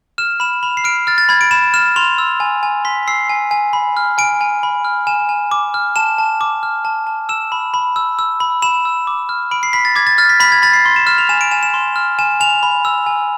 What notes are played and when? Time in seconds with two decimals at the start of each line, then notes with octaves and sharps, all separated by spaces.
0.18 F6 E7
0.40 B5 E7
0.63 B5 F7
0.77 C7
0.84 F6 D7
1.07 F6 A6
1.18 A6
1.29 B5 G#6
1.41 D7
1.51 B5 E7
1.74 F6 E7
1.96 C6 F7
2.18 E6
2.40 G#5
2.63 G#5
2.85 C6 B6
3.07 E6 C7
3.30 G#5
3.51 G#5
3.73 B5
3.97 F6
4.18 G#5 D7
4.41 G#5
4.63 B5
4.85 F6
5.07 G#5 E7
5.29 G#5
5.51 D6
5.74 F6
5.96 A5 E7
6.18 A5
6.41 D6
6.63 F6
6.85 A5
7.07 A5
7.29 E6 E7
7.52 B5
7.74 B5
7.96 E6
8.19 E6
8.40 B5
8.62 B5 E7
8.85 E6
9.07 D6
9.29 F6
9.51 B5 D7
9.63 C7
9.73 B5 B6
9.85 A6
9.96 D6 G#6
10.07 A6
10.18 F6 A6
10.29 B6
10.40 B5 B6
10.52 G#6
10.62 B5 A6
10.73 C7
10.85 C6
10.96 E7
11.07 F6 E7
11.18 F7
11.29 G#5 E7
11.41 D7
11.51 G#5 E7
11.63 E7
11.74 C6
11.96 F6
12.19 G#5 E7
12.40 G#5 F7
12.63 B5
12.85 E6
13.06 G#5